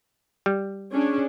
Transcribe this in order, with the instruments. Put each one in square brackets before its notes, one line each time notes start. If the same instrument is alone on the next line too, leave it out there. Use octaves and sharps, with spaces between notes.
[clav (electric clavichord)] G3
[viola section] C#4 D4 G#4